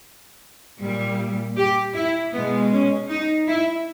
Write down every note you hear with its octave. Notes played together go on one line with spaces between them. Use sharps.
A#2 G3
G4
E4
B2 G#3 B3
C#4
D#4
E4